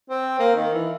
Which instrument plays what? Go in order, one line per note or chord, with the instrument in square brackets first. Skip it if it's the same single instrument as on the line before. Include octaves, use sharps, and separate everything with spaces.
[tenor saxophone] C4
A#3
D#3
E3